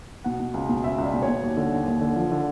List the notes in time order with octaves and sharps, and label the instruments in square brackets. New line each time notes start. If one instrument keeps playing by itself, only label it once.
[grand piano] B2 F#5
B2
C#2
B2
C#2 E5
C#2
D5
B2
C#5
B2
D#2
D3
D#2
D#2
D3
F3
D3